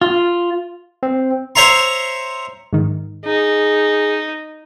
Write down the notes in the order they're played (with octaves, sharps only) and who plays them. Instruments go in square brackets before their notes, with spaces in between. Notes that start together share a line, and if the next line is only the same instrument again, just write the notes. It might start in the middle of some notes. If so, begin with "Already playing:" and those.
[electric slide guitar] F4
[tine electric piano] C4
[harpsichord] C5 C#5 E5 A#5 C6
[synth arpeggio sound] G#2 D#3
[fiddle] D#4 [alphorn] G#4